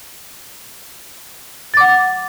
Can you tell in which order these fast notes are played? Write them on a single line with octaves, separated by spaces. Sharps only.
A6 D6 F#5